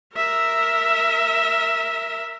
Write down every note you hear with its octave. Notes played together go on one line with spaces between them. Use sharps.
A#4 E5